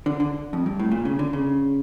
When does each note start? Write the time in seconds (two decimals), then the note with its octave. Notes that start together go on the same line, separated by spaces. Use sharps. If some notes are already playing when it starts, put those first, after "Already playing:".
0.06 D3
0.20 D3
0.53 F2
0.66 G2
0.79 A2
0.92 A#2
1.05 C#3
1.19 D3
1.33 C#3